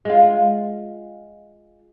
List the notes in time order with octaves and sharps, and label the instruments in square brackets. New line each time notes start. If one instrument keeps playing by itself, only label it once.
[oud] G#3 F4